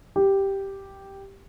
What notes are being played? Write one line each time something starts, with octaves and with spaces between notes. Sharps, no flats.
G4